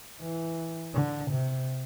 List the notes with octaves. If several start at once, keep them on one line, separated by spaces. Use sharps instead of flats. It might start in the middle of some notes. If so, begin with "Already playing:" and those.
E3
D3
C3